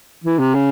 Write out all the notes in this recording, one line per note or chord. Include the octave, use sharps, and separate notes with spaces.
E3
C3
C#3